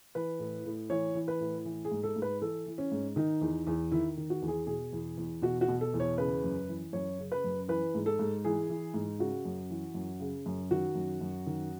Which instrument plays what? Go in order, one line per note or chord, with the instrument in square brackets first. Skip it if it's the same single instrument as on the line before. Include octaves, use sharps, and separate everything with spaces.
[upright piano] E3 B4
A2
A2
E3 C#5
E3
B4
A2
E3
G#4
G#2
A4
G#2
B4
E3 A4
E3
C#4
G#2
D#3 D#4
E2
E2
D#3 E4
D#3
F#4
E2
G#4
B2 G#4
E2
E2
B2 F#4
F#4
B2
A4
E2
C#5
C#3 B4
F#2
E3
F#2 C#5
C#3
B4
F#2
E3 B4
G#2
A4
G#2
E3 G#4
E3
G#2
C#3 F#4
F#2
E3
F#2
C#3
F#2
D#3 F#4
F#2
F#2
D#3